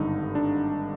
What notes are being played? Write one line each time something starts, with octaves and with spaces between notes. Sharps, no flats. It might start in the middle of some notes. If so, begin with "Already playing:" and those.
Already playing: G#1 G2 D3 D#4
D4